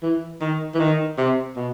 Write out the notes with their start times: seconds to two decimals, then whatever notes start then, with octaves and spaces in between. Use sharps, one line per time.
0.03 E3
0.41 D#3
0.74 E3
0.79 D#3
1.18 C3
1.56 B2